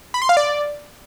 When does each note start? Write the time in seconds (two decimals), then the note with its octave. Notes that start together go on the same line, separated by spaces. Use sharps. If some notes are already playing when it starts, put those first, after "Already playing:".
0.14 B5
0.22 C6
0.29 F5
0.37 D5